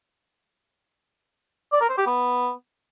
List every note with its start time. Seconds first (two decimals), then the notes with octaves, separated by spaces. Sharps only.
1.72 D5
1.81 A#4
1.89 C5
1.98 G4
2.06 B3